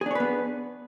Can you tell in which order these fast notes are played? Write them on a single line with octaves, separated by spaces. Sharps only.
G#4 D4 C#5 B4 B3